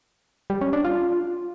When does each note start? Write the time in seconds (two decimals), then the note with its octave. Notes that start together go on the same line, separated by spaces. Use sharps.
0.50 G3
0.61 C#4
0.73 D4
0.85 F4